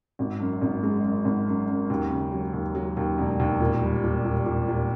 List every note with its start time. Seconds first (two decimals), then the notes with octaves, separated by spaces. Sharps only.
0.19 G#1
0.40 F#2
0.61 G#1
0.83 G#3
1.04 F#2
1.25 G#1
1.47 F#2
1.68 F#2
1.90 D#2
2.10 C#3
2.32 F#3
2.53 D#2
2.75 F#3
2.97 D#2
3.18 E1
3.40 D#2
3.60 A#2
3.83 G3
4.04 A#2
4.25 A#2
4.46 A#2
4.68 A#2